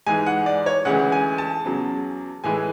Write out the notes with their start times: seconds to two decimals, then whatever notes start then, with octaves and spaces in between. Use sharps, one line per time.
0.06 G#2 E3 G#3 G#5
0.26 F#5
0.46 D5
0.66 C#5
0.85 D2 C#3 E3 G#3 F#5
1.12 G#5
1.38 A5
1.64 E2 C#3 F#3
2.44 A2 E3 G#3 G#5